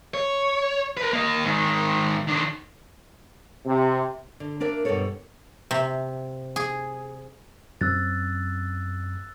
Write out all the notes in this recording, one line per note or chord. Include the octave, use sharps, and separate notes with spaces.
C#5
A#4 B4
A#3 D#5
G#2 D#3
D#3 D4
C3
D3
A#3 D4 A#4 D5 E5
G2 B2 D#3 A#3 A4 C#5
C3
G#4
F#2 C4 E6 F#6 A6